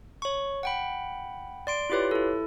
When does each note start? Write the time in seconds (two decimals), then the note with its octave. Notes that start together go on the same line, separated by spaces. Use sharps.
0.22 C#5 C#6
0.63 F#5 G5 B5
1.67 D5 C6 D7
1.90 E4 F4 G4 B4 C#5
2.11 E4 A4